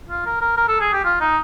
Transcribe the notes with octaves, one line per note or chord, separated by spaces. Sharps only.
F4
A#4
A#4
A#4
A4
G#4
G4
F4
D#4